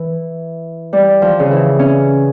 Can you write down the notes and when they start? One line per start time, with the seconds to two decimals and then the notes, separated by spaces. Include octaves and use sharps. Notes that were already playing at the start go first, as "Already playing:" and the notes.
Already playing: E3
0.93 G3
1.22 F3
1.39 C#3
1.51 E3
1.79 C#4